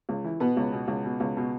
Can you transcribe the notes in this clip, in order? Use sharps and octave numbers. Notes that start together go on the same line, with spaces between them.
C#2
E3
B2 B3
C#2
B2
C#2
B2
C#2
B2